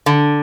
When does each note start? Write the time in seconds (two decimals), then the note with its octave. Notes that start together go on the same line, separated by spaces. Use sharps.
0.06 D3